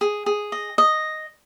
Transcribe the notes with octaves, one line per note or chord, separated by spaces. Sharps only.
G#4
G#4
D#5
D#5